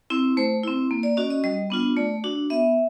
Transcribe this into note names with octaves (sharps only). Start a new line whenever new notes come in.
C4 E4
A3 C5
C4 E4
A#3
D5
C#4 F#4 D#5
D#5
G3 D#5
B3 D4 F4
A3 D5
D4 F#4
B3 E5